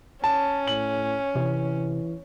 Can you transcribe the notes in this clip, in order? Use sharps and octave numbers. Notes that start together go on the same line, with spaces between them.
C#4 A5
A2 F#7
C3 E3